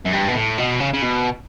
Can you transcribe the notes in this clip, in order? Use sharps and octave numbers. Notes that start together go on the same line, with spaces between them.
F#2
G2
B2
A2
B2
C#3
C#3
B2